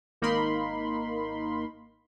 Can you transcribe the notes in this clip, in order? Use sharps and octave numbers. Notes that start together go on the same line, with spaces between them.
G#1 A#3 D#4 A#4 B5 C6